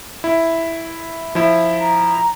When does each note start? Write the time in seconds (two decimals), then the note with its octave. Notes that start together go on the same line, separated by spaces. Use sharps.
0.24 E4
1.35 F3 E4
1.80 A#5